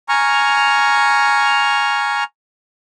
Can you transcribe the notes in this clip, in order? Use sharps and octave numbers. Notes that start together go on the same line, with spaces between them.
G#5 A#5 C#6 F6